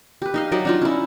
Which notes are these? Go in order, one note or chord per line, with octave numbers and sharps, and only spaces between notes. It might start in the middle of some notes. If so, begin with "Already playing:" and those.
G4 B4
D#4 D#5 F5
F#3 D#4 D5 D#5
D4 D#4 F4
C#4 E4